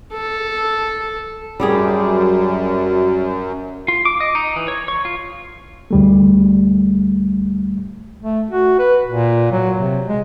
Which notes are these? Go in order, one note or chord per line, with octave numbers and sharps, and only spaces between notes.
A4
F#2 G3 G4 G#4
F4
D6
D#5
D#4
E3
C#5
C#5
F4
D2 G3 A3
A3
F#4
B4
A#2
F#3
C3
G#3